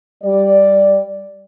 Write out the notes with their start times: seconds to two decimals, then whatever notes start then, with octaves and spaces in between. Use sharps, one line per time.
0.23 G3 D5